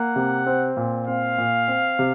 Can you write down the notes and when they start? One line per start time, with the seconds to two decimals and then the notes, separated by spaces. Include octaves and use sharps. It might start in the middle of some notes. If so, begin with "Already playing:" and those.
Already playing: A#3 F#5
0.16 C3
0.47 C4
0.77 A#2
1.07 C4 F5
1.38 A#2
1.68 C4
1.99 C3